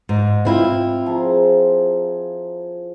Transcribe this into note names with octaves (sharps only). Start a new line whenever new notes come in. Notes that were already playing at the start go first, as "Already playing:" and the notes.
G#2
C4 E4 F4
F3 G#4 A#5